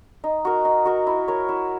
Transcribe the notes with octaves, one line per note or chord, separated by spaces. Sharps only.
D#4
F#4 A#4
D#4
F#4 A#4
E4
A#4 C#5
E4